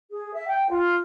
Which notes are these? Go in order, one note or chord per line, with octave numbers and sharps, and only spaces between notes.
G#4
E5
G5
F4